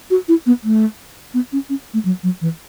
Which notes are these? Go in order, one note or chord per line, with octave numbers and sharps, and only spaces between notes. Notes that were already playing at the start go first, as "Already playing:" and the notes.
F#4
E4
B3
A3
B3
C#4
C#4
A3
F#3
F#3
E3